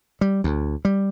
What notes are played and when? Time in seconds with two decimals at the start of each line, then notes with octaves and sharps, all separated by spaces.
0.21 G3
0.44 D2
0.85 G3